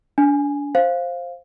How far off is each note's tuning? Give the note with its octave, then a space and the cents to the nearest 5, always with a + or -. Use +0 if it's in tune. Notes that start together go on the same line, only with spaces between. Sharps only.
D4 -30 G#5 +0
C5 +10 F5 +0